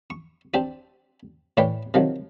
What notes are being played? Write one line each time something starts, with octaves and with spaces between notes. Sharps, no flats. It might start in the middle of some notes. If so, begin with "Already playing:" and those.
C#6
C4 D4 G4 D5
A2 E3 B4 C#5 D5 G5
C3 D#3 F3 F#3